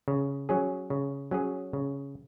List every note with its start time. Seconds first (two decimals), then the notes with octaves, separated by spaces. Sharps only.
0.08 C#3
0.49 F#3 C#4 G#4
0.90 C#3
1.31 F#3 C#4 G#4
1.73 C#3